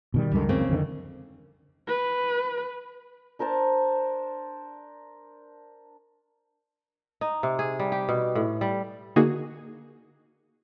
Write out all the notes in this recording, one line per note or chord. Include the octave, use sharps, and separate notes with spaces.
B2 D#3 G3
C#2 F#2 D3 D#3 G3
C#3 A#3 C4
F2 D3 D#3
B4
D4 A#4 C5 A5
D#4
C3
G#4
G3
G4
B2
A2
G3
D3 A#3 D#4 F#4 G#4